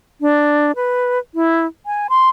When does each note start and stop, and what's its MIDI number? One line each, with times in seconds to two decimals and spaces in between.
0.21 0.72 62
0.76 1.19 71
1.35 1.66 64
1.86 2.08 80
2.10 2.29 84